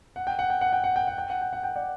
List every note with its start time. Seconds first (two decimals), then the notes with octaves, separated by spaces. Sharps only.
0.16 F#5
0.27 G5
0.39 F#5
0.50 G5
0.61 F#5
0.73 G5
0.84 F#5
0.96 G5
1.07 F#5
1.18 G5
1.30 F#5
1.41 G5
1.53 F#5
1.64 G5
1.76 D5 F#5